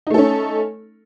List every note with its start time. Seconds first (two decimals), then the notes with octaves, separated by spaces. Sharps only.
0.07 D#4
0.10 A3
0.14 A4
0.18 C#4